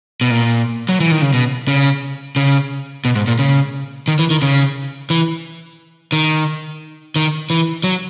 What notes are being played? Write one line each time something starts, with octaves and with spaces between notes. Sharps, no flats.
B2
A#2
F#3
E3
D#3
C#3
B2
C#3
C#3
B2
G#2
A#2
C#3
D#3
E3
D#3
C#3
E3
D#3
D#3
E3
F#3